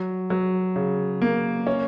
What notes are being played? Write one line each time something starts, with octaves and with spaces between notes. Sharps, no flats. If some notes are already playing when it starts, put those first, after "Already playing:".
Already playing: F#3
F#3
C#3
A#3
C#4